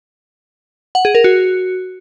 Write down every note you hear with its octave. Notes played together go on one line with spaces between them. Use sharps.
F#5
G#4
A#4
F#4